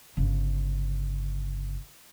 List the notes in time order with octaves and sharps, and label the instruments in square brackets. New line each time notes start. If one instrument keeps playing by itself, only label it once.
[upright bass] G1 C#3